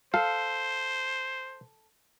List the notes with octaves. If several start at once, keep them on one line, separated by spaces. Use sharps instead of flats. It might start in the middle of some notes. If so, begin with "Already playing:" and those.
A4 C5 F5